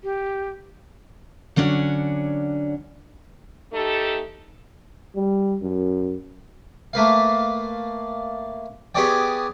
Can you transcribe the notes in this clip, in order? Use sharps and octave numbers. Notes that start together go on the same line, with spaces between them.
G4
D3 F#3 C#4 D4 F#5
A3 D#4 G4 A4
G3
F#2
A3 A#3 B4 F5
B3 G4 G#4 C#5 D5 G5